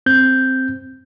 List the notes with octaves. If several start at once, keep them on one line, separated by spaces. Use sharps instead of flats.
C4 G6